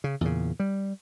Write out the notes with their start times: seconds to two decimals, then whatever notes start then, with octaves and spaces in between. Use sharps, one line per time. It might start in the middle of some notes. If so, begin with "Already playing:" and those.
0.04 C#3
0.21 E2 A#2 C#3
0.60 G3